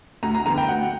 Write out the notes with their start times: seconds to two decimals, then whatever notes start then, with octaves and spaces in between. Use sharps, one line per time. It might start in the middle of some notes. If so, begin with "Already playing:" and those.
0.23 D2 A#5
0.34 A#5
0.46 D3 G3 B3 A#5
0.58 G5
0.68 D2 F#5